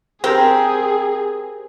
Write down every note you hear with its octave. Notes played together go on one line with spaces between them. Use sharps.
C4 G4 G#4 A#4